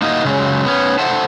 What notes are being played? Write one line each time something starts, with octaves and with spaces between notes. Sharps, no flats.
A#3 D#4 E4 F#4 A#4 D#5
C#3 F#3 G#3
B3 C#4
A4 C5 E5 F#5 A5